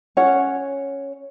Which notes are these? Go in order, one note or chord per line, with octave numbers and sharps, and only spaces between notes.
C#4 C#5 F#5